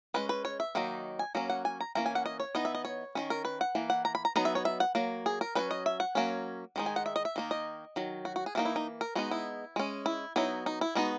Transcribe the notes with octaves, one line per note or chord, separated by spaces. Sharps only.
G#3 C#4 B4
B4
C#5
E5
D#3 F#3 A#3 D#4
G#5
F#3 A#3 C#4 A#5
F#5
G#5
A#5
E3 A#3 C#4 A#5
G#5
F#5
D#5
C#5
E3 B3 D#4 D#5
E5
D#5
C#5
D#3 G#3 C#4
A#4
B4
F#5
E3 A#3
F#5
A#5
B5
A#5
F#3 B3 D#4 A#5
E5
C#5
E5
F#5
F#3 A#3
G#4
A#4
F#3 A#3 C#4 B4
D#5
E5
F#5
F#3 A#3 C#4
D#3 G#3 D#4
G#5
F#5
E5
D#5
E5
D#3 A#3 D#4
D#5
D#3 F#3
F#4
F#4
G#4
E3 A#3 D#4 F#4
E4
D#4
A#4
G#3 B3 D#4 F#4
E4
G#3 C#4
E4
F#3 B3 D#4 E4
D#4
E4
G#3 B3 D#4 F#4